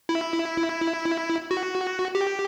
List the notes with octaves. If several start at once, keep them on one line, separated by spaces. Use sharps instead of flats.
E4
F#4
G4